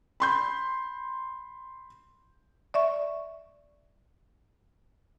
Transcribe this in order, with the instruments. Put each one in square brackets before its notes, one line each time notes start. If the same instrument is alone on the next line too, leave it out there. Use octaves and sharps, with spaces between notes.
[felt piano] B5 C6 G6
[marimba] D5 E5 C#6